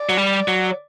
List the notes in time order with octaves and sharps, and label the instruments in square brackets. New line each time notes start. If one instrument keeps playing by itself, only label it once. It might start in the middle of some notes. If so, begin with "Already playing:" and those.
Already playing: [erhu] D5
[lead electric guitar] F#3
G3
F#3